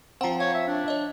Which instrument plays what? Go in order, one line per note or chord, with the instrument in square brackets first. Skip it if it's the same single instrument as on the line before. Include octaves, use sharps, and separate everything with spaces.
[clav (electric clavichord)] F3 C4 [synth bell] F#5 A#5
[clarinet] C#5 [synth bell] F5
[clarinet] E5
D4
[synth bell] C#5 D#5